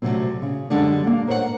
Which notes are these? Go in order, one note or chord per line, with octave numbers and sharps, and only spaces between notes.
D2 A2 C3 F#3 C4
C#3
F#2 D3 G3 G#3 D4
A#3
A#4 C5 C#5 E5 F#5